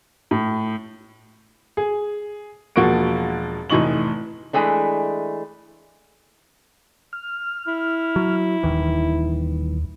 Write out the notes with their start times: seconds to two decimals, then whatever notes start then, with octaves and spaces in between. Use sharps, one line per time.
0.31 A2
1.77 G#4
2.76 E1 F3 A#3 F#4 C#6 D7
3.70 F1 A2 E3 D#4 C#6 F#7
4.53 E3 G#3 A3 D4
7.13 F6
7.67 E4
8.16 F#3
8.63 D#1 D#2 D#3 E3